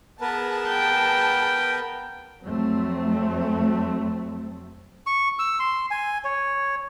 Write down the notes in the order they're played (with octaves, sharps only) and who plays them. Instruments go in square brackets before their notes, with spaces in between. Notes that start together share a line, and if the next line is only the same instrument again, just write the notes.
[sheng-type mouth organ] B3 A#4 B4 [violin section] G#4 A5
[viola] G5
[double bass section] F2 F#3 A3 C4
[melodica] C#6
E6
C6
G#5
C#5